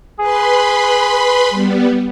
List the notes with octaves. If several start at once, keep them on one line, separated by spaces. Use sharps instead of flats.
G#4 B4 B5 C6
G3 B3